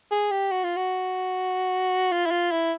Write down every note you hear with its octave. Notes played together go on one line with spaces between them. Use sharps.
G#4
G4
F#4
F4
F#4
F4
E4
F4
E4